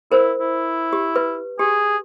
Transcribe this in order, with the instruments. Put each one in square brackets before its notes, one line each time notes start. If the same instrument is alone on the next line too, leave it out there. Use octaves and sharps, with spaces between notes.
[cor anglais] E4 [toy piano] A#4 C5
[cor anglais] E4
[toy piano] G4
B4
[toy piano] G4 [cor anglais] G#4